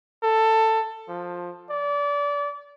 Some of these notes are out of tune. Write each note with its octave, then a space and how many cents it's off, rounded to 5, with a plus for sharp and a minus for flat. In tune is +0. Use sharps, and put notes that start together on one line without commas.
A4 +15
F3 +10
D5 -30